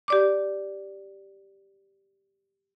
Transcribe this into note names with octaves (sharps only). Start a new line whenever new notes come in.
G4 D5 D6